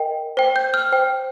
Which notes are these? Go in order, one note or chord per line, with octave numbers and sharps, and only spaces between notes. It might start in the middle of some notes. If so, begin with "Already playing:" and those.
Already playing: A#4 D#5 G5
C5 G5
G6
F6
C5 G5